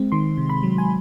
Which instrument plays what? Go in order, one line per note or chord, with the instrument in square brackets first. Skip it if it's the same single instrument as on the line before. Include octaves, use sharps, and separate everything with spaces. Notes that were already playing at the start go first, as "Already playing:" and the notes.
Already playing: [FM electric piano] G#3 C4
D#3 C6
C3
B5
F#3
G#5